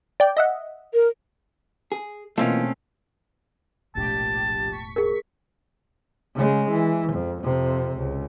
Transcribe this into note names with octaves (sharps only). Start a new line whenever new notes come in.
D5 G5
D#5 E5 F#5
A#4
G#4
B2 E3 A3 A#3 C4 C#4 F4 D#5
E1 A#1 A2 G4 A5
C#6 B6
G#4 A#4
C#3 G#3
E3
F2
F2 C3
C#2